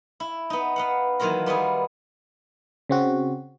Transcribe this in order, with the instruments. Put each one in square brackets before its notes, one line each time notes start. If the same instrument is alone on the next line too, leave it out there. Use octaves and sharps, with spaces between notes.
[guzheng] E4
B3 D#4
B3 F5 F#5
D#3 E3 F#3 A#3 F4 A#4
G3 B3 D#4 G#4
[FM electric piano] C#3 C4 F#4